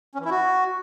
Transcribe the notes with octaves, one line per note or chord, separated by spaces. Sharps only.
C#4
E3
E4
F#4